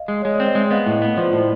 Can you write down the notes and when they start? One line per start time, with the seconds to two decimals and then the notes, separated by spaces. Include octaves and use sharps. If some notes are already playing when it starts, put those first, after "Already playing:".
Already playing: D#5 F5
0.08 G#3
0.22 G#3 C#5
0.35 D5
0.40 C4
0.46 D#5
0.55 G#3 E5
0.71 B3 D#5 F5
0.86 A2
1.02 B3
1.17 F3 C5 D5
1.33 A2 C5 D5